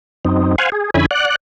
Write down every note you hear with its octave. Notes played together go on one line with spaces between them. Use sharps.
F#2 C4 D#4
C5 F5 F#5 G#5
G#4
F2 D3 C#4 E4 G#5 B5
D5 F#5 F#6